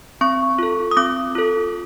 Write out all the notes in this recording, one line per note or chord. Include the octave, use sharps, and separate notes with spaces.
C4 C#6
F4 A4
D#6
C4 D6
F4 A4